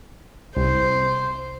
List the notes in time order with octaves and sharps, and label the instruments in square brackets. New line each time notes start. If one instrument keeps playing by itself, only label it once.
[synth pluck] C2 [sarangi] C5